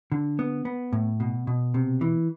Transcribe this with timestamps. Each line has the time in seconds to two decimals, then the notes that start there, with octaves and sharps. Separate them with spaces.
0.12 D3
0.39 B3
0.65 B3
0.93 A2
1.20 B2
1.47 B2
1.74 C3
2.01 E3